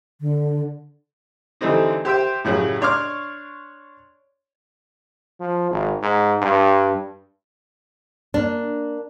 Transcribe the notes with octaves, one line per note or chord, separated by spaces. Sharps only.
D3
D3 E3 G3 A3 C4 D#4
G4 C5 E5 G5
A2 C#3 F#3 G3
D4 C#5 C6 D6 F6
F3
G#1
G#2
G2
A#3 D4